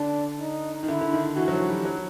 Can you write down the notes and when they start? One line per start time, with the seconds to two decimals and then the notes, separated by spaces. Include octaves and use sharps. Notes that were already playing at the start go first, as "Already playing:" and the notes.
Already playing: D3 D4
0.40 D#4
0.83 D#3
0.88 D3 E4
1.01 D3
1.13 D#3
1.37 E3 F#4
1.48 F#3
1.53 F3
1.69 G3
1.85 F#3